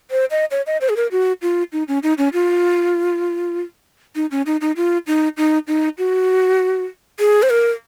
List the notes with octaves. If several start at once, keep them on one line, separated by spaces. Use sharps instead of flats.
C5
D#5
C#5
D#5
C5
G#4
A#4
F#4
F4
D#4
C#4
D#4
C#4
F4
D#4
C#4
D#4
D#4
F4
D#4
D#4
D#4
F#4
G#4
C5
A#4